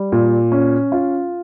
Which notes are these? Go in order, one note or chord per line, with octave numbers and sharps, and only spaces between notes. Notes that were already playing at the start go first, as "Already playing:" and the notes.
Already playing: G3
A#2
C#4
F4